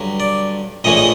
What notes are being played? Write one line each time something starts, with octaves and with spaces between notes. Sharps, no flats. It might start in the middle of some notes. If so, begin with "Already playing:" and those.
Already playing: G2 D3 F#3
D5
A#1 A2 E3 G#3 D#5
D#5